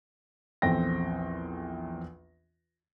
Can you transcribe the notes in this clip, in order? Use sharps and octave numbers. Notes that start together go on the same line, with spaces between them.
A#1 E2 C4 A4 G5 A#6